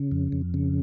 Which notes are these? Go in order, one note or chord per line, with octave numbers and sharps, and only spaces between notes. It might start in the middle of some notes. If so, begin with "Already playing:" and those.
Already playing: C#3
F2
F2
C#3